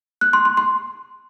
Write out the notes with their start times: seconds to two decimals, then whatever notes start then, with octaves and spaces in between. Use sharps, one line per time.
0.21 F#6
0.33 C6
0.45 C6
0.57 C6